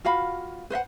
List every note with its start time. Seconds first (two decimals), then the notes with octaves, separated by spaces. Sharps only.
0.05 F4 F#4 F5 B5
0.70 B4 C5 E5 F#5